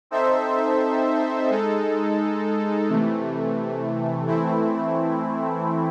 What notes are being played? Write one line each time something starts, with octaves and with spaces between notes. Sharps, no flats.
C4 D#4 A4 C5 E5
G#3 D#4 A4
C3 E3 A3
E3 A3 C4 E4